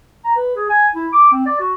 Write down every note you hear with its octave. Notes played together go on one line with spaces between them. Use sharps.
A#5
B4
G#4
G#5
E4
D6
C4
D5
F#4